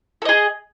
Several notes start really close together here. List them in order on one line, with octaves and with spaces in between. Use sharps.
A4 D#5 G#4